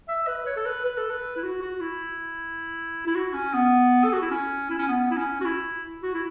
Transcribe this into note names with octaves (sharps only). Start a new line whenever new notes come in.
E5
B4
C#5
A4
B4
B4
A4
B4
E4
F#4
F#4
E4
E4
F#4
C#4
B3
A4
F#4
E4
C#4
E4
C#4
B3
E4
C#4
F#4
E4
F#4
E4